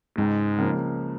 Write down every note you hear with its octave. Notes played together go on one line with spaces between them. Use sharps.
C#2 G#2
C#3 F3 A#3